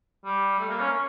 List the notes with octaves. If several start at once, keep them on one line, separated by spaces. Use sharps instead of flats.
G3
A3
A#3
C#4